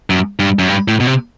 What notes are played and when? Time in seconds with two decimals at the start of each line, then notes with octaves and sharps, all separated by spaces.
0.10 F#2
0.40 G2
0.59 F#2
0.68 G2
0.88 A2
1.00 B2
1.07 C3